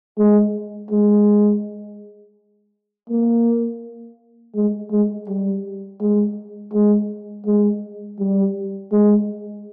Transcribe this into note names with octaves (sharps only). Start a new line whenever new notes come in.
G#3
G#3
A#3
G#3
G#3
G3
G#3
G#3
G#3
G3
G#3